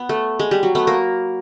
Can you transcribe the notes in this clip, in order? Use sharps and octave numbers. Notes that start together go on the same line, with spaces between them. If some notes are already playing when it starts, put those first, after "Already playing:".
Already playing: B3
A3
G#3
G3
F#3
A3 B3
A#3